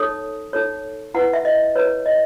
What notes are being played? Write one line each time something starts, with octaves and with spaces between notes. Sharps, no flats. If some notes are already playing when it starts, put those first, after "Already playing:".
Already playing: D#4 A4 C#5 D#6
D#4 A4 C#5
E4 B4 F#5
E5
D#5
E4 B4 C#5
D#5